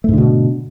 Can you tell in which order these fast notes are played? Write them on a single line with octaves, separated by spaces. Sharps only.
A3 G#2 D3 B2